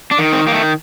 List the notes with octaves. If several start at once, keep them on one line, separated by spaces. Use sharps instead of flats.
D4
D#3
C4
D#3 A#3
A3